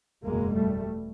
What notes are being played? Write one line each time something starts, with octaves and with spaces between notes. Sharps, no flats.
F#1 E2 B2 G#3 A#3
G3 A3